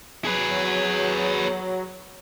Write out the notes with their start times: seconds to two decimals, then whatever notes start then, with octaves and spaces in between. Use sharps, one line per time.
0.25 F#3 G#4 B4